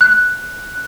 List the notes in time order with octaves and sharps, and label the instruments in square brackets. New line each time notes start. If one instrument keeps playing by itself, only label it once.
[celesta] F#6